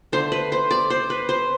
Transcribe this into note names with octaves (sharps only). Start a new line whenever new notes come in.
D3 A3 D4 C5
B4
C5
D5
C5
B4
C5